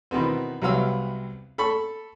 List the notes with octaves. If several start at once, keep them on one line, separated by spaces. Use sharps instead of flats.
B2 D#3 E3 B3 C4
C2 C3 F#3 B3 F5 E6
A4 B5 C#6